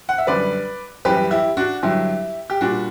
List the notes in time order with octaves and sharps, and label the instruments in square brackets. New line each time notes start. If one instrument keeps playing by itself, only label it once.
[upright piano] F#5
E5
F#2 D3 G3 B4 D5
F#2 E3 G3 G4 B4
E4 G4
D4 F#4
G2 D3 F#3 E4 G4
G4
A#2 G3 D4 F#4